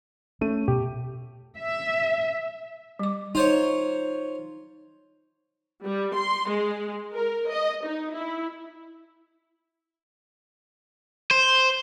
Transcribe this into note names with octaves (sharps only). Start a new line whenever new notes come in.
A3 C#4 D#7
B2 G4
E5
G3 D6
D#4 F4 C5 C#5
G3
C6
G#3
A#4
D#5
D#4
E4
C5